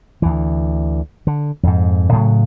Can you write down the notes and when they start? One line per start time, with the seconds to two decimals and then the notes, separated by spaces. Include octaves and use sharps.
0.22 D2 E3
1.27 D3
1.63 F2 G#2
2.12 A2 C#3 F#3